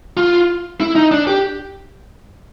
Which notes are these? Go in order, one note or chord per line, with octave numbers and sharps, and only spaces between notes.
F4
E4
D#4
D4
G4